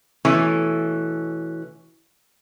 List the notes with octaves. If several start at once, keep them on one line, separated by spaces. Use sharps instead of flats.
B2 E3 A3 C#4